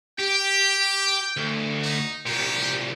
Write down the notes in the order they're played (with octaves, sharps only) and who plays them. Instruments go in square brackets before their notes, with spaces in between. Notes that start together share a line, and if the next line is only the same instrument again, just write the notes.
[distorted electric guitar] G4 [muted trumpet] G5
[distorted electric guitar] D2
[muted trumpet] D#4
[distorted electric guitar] C2 A#2 [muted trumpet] G4